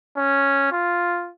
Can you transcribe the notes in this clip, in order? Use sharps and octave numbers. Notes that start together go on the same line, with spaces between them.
C#4
F4